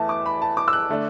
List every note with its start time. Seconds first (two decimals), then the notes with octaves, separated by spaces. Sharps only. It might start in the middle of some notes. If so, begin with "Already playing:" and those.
Already playing: E2 E3 A3 E4 A5
0.09 D6
0.26 B5
0.42 A5
0.57 D6
0.68 E6
0.73 F#6
0.90 D3 A3 D4